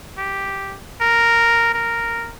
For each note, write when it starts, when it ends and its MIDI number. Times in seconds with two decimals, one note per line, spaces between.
0.17 0.77 67
1.01 1.73 70
1.73 2.32 70